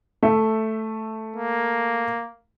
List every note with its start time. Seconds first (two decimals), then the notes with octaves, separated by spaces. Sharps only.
0.23 A3 E5
1.36 A#3